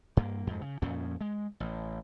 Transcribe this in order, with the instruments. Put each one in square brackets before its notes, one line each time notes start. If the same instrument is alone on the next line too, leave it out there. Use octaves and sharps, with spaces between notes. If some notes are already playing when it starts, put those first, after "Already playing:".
[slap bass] G2 A#3
F2 G#2
C#3
F2 A#2 F3 C#4
G#3
A1